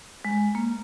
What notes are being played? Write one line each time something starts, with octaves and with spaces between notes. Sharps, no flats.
G#3
A#3